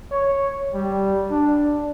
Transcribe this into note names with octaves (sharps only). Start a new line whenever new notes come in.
C#5
G3
D4